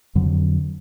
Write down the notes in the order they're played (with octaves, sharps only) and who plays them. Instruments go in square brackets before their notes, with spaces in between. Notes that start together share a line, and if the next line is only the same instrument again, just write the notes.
[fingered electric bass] F2 D3 F#3